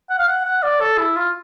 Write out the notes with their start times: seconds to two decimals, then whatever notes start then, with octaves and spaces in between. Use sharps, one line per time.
0.10 F#5
0.19 F5
0.28 F#5
0.45 F#5
0.63 D5
0.80 A4
0.98 E4
1.16 F4